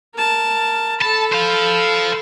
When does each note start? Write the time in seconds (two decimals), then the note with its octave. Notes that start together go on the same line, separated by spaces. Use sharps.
0.16 A#4 A5
1.01 A4 A5 B5
1.32 C5 F5